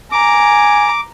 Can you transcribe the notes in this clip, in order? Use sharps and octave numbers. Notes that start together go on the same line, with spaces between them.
G#5 A#5 D6